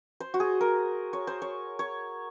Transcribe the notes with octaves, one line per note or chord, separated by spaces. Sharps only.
C5
F#4
G#4
A#4
C#5
C5
C#5
C#5